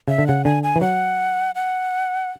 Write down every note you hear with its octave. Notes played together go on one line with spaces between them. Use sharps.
C#3 E5
D3
C#3 F#5
D3 G#5
G#5
E3
F#3 F#5
F#5